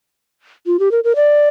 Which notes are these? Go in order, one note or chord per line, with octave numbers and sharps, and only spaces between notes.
F4
G4
A#4
A#4
D5